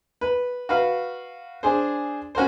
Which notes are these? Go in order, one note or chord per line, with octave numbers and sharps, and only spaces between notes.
B4
F#4 B4 F5
D4 G#4 C5
C#4 F#4 A#4 C5